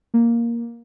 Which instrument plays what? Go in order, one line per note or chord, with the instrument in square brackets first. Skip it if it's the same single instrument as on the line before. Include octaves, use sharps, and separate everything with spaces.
[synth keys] A#3